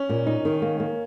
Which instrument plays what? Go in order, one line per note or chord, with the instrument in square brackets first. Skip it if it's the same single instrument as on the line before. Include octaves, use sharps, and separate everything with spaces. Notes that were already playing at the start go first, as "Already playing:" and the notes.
Already playing: [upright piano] C#4
[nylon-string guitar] A#2
D#4
D#3
A#3
A#3